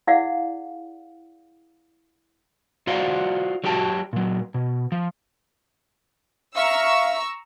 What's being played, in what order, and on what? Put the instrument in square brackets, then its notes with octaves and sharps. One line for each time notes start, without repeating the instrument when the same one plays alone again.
[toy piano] E4 G#4 D5 F5 F#5
[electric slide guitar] F4 F#4 C5 D5 F5 F#5
F#3 F#4 G4 G5 A5
A#2 F#3
B2
F3
[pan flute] E5 [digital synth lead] F5 [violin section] A#5 C#6 E6